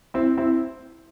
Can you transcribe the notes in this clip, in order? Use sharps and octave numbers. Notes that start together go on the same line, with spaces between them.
C4 E4
C4 E4